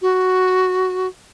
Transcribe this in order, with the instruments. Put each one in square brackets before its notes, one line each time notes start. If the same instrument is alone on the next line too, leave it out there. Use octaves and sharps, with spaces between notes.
[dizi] F#4